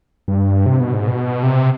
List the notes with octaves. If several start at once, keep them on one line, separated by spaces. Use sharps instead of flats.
G2
C3
B2
G#2
B2
C3